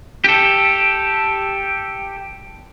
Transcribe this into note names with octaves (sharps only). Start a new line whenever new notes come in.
G4 A4